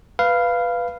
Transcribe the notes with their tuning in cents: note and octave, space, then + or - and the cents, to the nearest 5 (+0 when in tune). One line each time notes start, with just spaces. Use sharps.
B4 +0 F5 -10